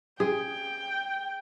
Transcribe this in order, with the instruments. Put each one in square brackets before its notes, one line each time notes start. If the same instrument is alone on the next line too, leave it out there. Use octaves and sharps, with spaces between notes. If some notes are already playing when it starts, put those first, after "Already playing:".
[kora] G#4 [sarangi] G5